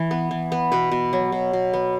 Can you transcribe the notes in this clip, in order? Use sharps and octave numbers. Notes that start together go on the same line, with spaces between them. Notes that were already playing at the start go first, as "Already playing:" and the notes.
Already playing: E3
B3
E3
B3
B2 B4
B2
F#3
B2
B2
B3